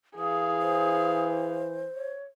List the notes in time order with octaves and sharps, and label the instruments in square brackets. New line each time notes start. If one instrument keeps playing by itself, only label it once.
[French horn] E3 [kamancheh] G#4 F5 [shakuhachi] D#6
[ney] C5
[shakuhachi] C#5